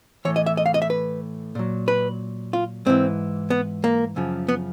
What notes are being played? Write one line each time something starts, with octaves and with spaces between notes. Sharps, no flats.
A2 E3 C#5
D#5
E5
D#5
F5
D#5
E5
B4
A#2 F#3
B4
F4
G#2 E3 C4
B3
A#3
F#2 C#3 F3
B3